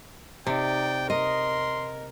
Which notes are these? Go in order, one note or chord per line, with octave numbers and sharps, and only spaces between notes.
C3 D#4 D5 G5
A#4 D#5 C6